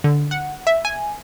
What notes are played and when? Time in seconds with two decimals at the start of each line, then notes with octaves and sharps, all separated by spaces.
0.04 D3
0.31 F#5
0.67 E5
0.85 G#5